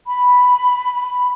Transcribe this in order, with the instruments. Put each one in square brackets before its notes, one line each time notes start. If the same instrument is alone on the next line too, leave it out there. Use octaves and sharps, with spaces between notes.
[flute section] B5